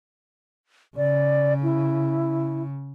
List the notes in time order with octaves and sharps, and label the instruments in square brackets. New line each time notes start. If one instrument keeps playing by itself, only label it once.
[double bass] C#3 [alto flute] D5
[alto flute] E4